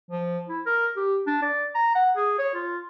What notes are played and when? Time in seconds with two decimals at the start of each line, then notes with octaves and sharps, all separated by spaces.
0.11 F3
0.49 E4
0.66 A#4
0.97 G4
1.27 D4
1.42 D5
1.75 A#5
1.95 F#5
2.17 G#4
2.38 C#5
2.54 F4